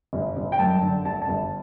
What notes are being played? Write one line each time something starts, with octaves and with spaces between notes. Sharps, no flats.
G1
G1
G5
F#2 A5
D3
G1 A5
A5
G1